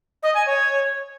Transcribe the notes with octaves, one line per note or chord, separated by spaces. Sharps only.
D#5
G#5
C#5